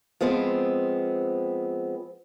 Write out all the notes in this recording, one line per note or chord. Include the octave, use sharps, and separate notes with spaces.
F3 G#3 B3 C4